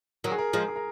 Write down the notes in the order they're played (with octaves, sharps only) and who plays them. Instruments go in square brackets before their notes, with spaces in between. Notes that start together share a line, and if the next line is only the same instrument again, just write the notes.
[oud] D#3 F#3 [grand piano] A#4
[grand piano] G#4
A#4
[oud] F3 G#3
[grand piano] G#4
A#4